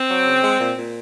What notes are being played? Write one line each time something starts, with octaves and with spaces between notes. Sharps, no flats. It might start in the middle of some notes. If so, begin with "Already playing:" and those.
Already playing: C4
F#3
C#3
G#3
A#2
A#2